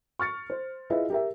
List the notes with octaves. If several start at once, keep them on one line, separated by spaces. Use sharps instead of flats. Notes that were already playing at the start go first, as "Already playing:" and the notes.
C#6 F6 A6 C#7
C5
E4 F4 G#4 B4 D#5 E5
G4 A#4 E5